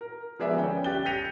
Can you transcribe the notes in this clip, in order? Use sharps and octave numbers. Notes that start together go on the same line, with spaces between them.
A#4
F3 G#3 B3 G#4 D5 E5
G1 C#4 G5
G4 G5 F#6 A6 G7
G6 A#6 B6 C#7 D#7 F7